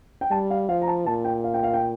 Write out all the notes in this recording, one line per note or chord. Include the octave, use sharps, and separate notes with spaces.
G5
G3 A5
F5
F3 F5
A#5
A5
A#2 A5
G5
F5
G5
F5
G5